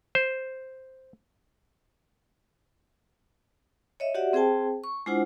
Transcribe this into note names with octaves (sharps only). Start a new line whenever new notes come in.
C5
C#5 D#5 E5
F#4 G4 D5 E5 F#5
C4 G#4 C5 G5 A5
C#6
G#3 D4 E4 F4 C5 F#5